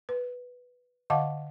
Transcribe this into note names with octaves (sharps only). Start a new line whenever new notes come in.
B4
D3 D#5 F5 F#5 A5 D6